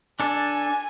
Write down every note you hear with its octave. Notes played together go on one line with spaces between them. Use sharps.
D4 A4 G#5